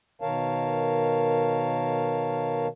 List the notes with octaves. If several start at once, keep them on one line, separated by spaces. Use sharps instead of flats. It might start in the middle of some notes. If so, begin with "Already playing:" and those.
B2 D#3 A#4 C#5 F5 A5